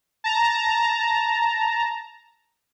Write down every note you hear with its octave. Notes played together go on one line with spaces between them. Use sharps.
A5 A#5